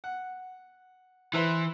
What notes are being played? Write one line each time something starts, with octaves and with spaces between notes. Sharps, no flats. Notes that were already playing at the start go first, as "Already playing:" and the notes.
F#5
E3 E4 B4 C5